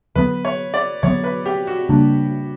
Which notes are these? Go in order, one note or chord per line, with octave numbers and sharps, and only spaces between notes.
D3 F#3 B3 B4
C#5
D5
D3 F#3 B3 C#5
B4
G4
F#4
C#3 G3 A#3 D4